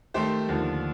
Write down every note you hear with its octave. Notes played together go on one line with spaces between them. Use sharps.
D#3 A3 C4 G4 C5
D#2 D3 F3